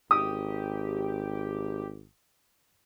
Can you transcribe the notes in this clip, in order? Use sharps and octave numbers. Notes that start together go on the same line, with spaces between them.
G#1 G4 D#6